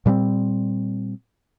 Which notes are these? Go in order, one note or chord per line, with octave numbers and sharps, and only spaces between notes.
A#2 G3 B3 C4